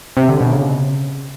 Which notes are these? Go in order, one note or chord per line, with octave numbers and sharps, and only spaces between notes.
C3
D3
B2
C#3